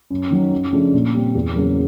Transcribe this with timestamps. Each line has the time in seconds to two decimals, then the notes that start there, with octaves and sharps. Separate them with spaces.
0.10 F#2
0.31 D#3 F#3
0.52 F#2
0.72 C#3 F3 A3 D4
0.94 A#2
1.14 G3 C4
1.35 E2
1.55 C#3 F#3 A#3